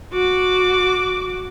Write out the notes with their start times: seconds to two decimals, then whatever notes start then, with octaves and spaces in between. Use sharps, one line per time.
0.12 F#4 D6